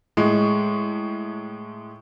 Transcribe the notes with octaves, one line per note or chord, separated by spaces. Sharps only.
A2 G#3